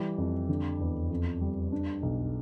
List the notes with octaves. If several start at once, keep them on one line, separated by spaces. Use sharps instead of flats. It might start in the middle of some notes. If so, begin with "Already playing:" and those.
Already playing: E3 G3
F2
D3
E2
F2
G3
D4
B1